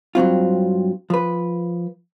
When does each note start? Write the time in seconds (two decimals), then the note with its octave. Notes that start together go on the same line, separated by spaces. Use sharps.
0.15 G2 F#3 C4 F4
1.10 F3 B4